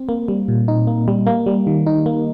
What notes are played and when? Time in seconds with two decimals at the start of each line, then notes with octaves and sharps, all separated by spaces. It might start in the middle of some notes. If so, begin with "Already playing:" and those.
Already playing: C4
0.09 A#3
0.28 G3
0.48 A#2
0.68 D#4
0.87 A#3
1.08 G3
1.26 A#3
1.46 G3
1.67 D#3
1.86 D#4
2.06 A#3